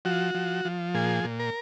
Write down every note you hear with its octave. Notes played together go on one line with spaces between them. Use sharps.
F3 F#4
F3
F3
A#2 G#4
A#2
A#4